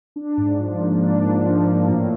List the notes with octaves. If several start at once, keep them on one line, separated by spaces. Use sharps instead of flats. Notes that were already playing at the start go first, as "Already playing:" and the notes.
D4
G#2
F3
A#3
D4
G#2
F3
A#3
A2